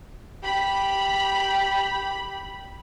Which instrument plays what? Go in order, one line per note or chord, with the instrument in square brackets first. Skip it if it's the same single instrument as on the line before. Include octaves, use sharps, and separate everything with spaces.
[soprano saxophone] G4 [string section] B5